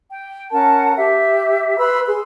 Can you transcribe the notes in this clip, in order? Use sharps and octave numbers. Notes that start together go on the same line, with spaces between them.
G5
C#4 A#4 F#5 A5
G4 E5
B4 B5 C6 E6
G#4 C6